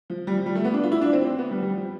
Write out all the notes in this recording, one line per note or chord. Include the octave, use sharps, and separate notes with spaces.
F3
G3
F3
G3
A3
B3
D4
F4
E4
D4
C4
C4
B3
G3
G3
F3